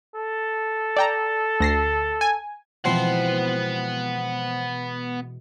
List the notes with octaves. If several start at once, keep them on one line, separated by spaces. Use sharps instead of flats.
A4
D5 G5 A#5
D2 A#6 C7
G#5
B2 E3 F3 G#3 B3 C4 F#5